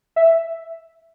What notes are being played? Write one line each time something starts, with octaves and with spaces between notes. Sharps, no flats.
E5